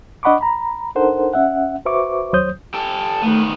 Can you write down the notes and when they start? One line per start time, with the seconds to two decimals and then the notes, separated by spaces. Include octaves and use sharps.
0.23 D4 D#5 F#5 B5 C#6 D6
0.41 A#5 B5
0.95 D4 D#4 A4 A#4 C5 F#5
1.33 C#4 E5 F#5
1.85 F#4 B4 C5 E5 C#6 D6
2.33 D#2 F#3 C5 C#5 D#6 G6
2.74 G4 A4
3.22 D#3 A3 B3